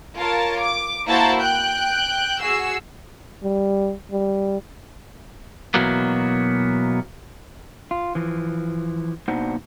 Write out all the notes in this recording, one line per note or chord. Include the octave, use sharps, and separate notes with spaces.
F4 A#4 C#5 A5
D6
A#3 E4 F#4 C5 A5 A#5
G5 F#6 G6
F#4 G#4 E6 C7
G3
G3
B2 E3 F#3 A#3 B3
F4
E3 F3
B2 A#3 D4 D#4 C5 F#5